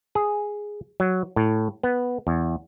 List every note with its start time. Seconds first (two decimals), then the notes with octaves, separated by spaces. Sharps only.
0.15 G#4
1.00 F#3
1.36 A2
1.83 B3
2.27 E2